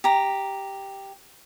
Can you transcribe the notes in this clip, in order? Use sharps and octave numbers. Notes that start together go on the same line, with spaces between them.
G4 A#5